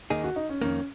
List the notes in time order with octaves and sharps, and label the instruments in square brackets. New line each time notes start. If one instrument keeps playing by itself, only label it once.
[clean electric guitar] D#2 D#3 A#3 D#4 G#4 [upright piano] D#5
[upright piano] F#4
D#4
C#4
[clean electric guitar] F2 D#3 A#3 [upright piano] C#4